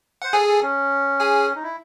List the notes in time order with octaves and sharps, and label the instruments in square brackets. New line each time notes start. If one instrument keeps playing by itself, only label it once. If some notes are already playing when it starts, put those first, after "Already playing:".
[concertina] C5 [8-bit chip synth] F#5
[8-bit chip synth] G#4 G#5 [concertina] A4
[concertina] A4
C#4
[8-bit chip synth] G#4 G#5
[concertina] D#4
E4